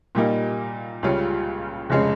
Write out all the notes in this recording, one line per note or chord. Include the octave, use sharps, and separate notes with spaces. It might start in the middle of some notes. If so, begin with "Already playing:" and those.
A#2 G3 A#3 D#4
C#2 C#3 G3 C#4 F4
F1 C#3 G#3 C#4